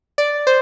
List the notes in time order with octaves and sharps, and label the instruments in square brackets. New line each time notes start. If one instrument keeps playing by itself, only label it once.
[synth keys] D5
C5